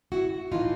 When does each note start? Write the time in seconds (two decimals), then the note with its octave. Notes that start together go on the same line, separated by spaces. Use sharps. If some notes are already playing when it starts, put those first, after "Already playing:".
0.12 E4 F#4
0.51 A2 E3 D#4 F4